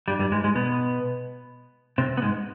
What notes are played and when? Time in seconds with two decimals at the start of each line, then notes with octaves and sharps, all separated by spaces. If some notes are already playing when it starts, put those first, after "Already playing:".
0.08 G2 G3
0.19 G2 G3
0.32 G#2 G#3
0.44 G#2 G#3
0.55 B2 B3
1.98 C3 C4
2.17 B3
2.22 G#2 G#3